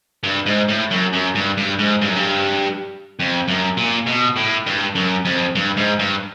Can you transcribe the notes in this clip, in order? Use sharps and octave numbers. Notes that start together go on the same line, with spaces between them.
G2
G#2
A2
F#2
F#2
G2
G2
G#2
G2
F#2
G2
F2
F#2
A#2
B2
A2
G2
F#2
F2
G2
G#2
G2